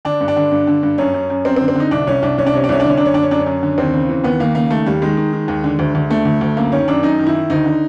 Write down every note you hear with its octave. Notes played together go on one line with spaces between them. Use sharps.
D3 D4
G2
D4
D3
G2
D3
G2
F#2 C#4
F#2
F#2
F#2 C4
C4
D3
C4
D3 D#4
C2 D4
C2 C#4
C2 D4
C2 C#4
D4
C3 C#4
D4
C2 C#4
D4
D3 C#4
F#2 D4
C#4
D3 D4
C#4
F#2 D4
C#4
F#2
D3
D#2 C4
C#3
E3
D#2 B3
D#2 A#3
C#3 A#3
D#3 A3
D#2 G3
D#3 G#3
D#3
D#3
D#2
D3
D2
D2
D3 A3
D2
D2
F#2 A#3
D#3 C#4
F#2 D4
F#2 D#4
D#3
E4
D#3
D2 D#4
D3